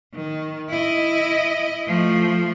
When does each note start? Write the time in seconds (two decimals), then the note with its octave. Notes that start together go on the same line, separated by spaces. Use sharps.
0.14 D#3
0.70 E4 D#5
1.87 F3 A3